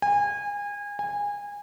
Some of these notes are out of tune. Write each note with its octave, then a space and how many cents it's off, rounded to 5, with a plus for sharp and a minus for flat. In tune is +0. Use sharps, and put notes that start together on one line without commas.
G#5 -30
G#5 -25